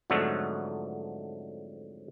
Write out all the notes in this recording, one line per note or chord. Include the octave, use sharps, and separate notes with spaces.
F2 G#2 D3 F#3 A3 A4